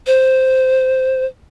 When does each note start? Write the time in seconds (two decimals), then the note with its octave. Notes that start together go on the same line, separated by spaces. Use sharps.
0.07 C5